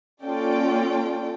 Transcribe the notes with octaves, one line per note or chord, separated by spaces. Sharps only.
A#3 C#4 F4 A4 D5 G5